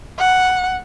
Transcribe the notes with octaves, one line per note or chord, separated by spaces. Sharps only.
F#5